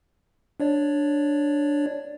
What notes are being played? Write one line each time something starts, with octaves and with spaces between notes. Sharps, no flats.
D4 C#5 D5